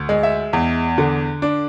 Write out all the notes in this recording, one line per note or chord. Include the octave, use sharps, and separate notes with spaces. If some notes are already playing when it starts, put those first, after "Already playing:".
Already playing: D2
G#3
E5
E2
D3
D4